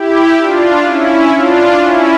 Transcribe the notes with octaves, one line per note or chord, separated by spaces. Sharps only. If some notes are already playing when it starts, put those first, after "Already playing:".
Already playing: E4 G4
D4 F4
C#4 E4
D4 F4
C#4 E4